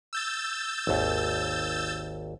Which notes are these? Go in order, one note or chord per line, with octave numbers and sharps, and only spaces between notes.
E6 G6 A6
G#1 D#2